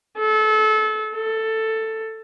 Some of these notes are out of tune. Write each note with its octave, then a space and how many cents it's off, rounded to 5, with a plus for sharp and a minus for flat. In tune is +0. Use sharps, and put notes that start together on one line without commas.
A4 -30
A4 +10